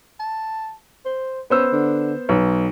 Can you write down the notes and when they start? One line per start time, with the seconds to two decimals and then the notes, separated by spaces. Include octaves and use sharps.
0.19 A5
1.05 C5
1.50 B3 C#4 C5 E6
1.72 D3
2.29 B1 B3